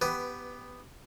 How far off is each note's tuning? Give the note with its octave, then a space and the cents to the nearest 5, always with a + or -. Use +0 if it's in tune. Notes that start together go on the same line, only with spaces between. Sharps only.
B3 +0 G4 +0 B4 +15